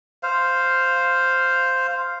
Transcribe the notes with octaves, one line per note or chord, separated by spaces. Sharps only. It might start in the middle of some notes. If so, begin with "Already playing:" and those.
C5 F5